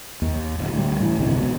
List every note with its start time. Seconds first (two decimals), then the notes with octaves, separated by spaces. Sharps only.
0.22 D#2
0.58 D1
0.73 D2 G3
1.00 A2 E3
1.19 G1 C2 C3 E3
1.35 C#2 B2